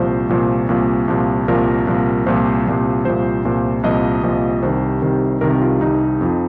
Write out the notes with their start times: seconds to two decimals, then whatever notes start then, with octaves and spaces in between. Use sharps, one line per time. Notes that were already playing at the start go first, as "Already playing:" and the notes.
Already playing: C2 A#2 F3 C5
0.29 C2 A#2 F3
0.69 C2 A#2 F3
1.08 C2 A#2 F3
1.48 C2 A#2 F3 A#4
1.87 C2 A#2 F3
2.26 C2 A#2 F3 C5
2.66 C2 A#2 F3
3.05 C2 A#2 F3 C5
3.45 C2 A#2 F3
3.83 C2 A#2 F3 D#5
4.23 C2 A#2 F3
4.63 C2 C3 D#3 C5
5.02 C2 C3 D#3
5.41 C2 C3 D#3 A#4
5.62 F4
5.81 C2 C3 D#3 D#4
6.21 F2 F3